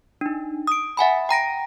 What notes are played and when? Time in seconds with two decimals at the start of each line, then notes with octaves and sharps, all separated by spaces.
0.21 D4 D#4
0.67 D#6 D7
0.97 E5 F#5 G#5 B5
1.29 G5 A#5 A#6 D7